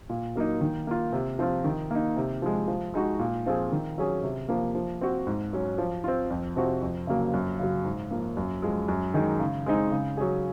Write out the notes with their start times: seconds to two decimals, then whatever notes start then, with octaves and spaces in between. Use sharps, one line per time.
0.09 A#2
0.36 F#3 A#3 D#4
0.61 D#3
0.87 A#3 F4
1.13 C3
1.39 F3 C4 F4
1.64 D#3
1.91 A#3 D#4
2.17 C3
2.42 F3 G#3
2.68 F3
2.94 G#3 D#4 F#4
3.19 A#2
3.46 F3 C4 F4 G#4
3.72 D#3
3.98 F#3 C#4 G#4
4.23 C3
4.49 F3 A#3
4.75 F3
5.01 C4 F#4
5.27 G#2
5.53 F#3 C#4
5.78 F3
6.04 C4 F4
6.30 F2
6.56 C3 F3 C4 F#4
6.82 F2
7.07 C#3 F#3 A#3
7.34 F#2
7.59 C#3 F#3
7.85 G#2
8.11 F3 A#3
8.37 F#2
8.62 F3 G#3
8.88 F#2
9.14 D#3 G#3 D#4 G#4
9.40 C#3
9.66 G#3 C4 D#4
9.92 C#3
10.17 F#3 C#4 G#4